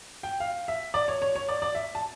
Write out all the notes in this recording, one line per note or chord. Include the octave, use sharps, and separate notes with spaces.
G5
F5
E5
D5
C#5
C#5
C#5
D5
D5
E5
A5